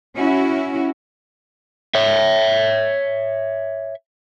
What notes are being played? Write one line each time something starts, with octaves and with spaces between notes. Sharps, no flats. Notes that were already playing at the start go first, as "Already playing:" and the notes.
C#4 E4 F#4
C#5 E5